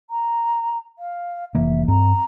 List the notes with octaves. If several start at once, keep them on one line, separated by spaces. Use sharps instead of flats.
A#5
F5
F1 E3 A#3 E5
G2 C4 A#5